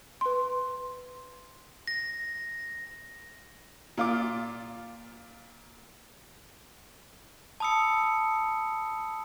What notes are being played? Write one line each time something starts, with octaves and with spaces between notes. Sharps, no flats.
B4 C6
A#6
A#2 F4 D6
A5 B5 D#6 E6 C#7